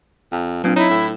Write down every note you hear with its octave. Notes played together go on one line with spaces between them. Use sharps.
F2
A#2 F#3 C4 D4
D#4 E4 C#5
A2